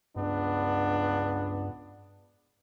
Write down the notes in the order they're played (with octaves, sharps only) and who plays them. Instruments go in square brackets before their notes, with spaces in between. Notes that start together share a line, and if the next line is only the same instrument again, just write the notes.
[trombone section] C#2 B3 D4 [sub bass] G2